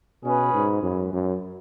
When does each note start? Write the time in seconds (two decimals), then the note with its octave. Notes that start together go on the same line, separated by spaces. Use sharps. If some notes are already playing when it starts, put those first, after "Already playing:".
0.23 B2 C#4 G#4 B4
0.54 G#2
0.83 F#2
1.13 F#2